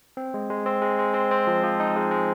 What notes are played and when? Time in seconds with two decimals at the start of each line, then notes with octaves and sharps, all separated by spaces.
0.17 C4
0.34 G#3
0.50 G#3
0.66 C4
0.82 G#3
0.99 G#3
1.14 C4
1.31 C4
1.47 F3
1.63 F3
1.80 D#4
1.96 G#3
2.11 G#3